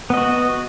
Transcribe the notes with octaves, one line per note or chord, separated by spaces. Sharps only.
B3 F#4 D#5